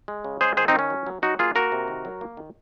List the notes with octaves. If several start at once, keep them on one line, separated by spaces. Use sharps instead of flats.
G#3
C#3
G#3 G#4 C5
D#3 G#4 C5
C4 D#4
D#3 C#4
F#3
F#3
F#3 D#4 F#4
A#3 F4 G#4
A#3 F#4 A#4
C3
D#3
F#3
A#3
D#3